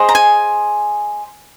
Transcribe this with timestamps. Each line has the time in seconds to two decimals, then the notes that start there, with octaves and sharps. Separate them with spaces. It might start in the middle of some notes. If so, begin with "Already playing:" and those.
Already playing: G#4 C5 D#5
0.09 A#5
0.15 G#5